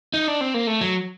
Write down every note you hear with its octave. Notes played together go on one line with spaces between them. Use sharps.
D#4
D4
C4
A#3
A3
F#3